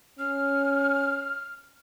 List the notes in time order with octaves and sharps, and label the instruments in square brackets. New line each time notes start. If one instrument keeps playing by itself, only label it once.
[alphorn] C#4 [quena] F6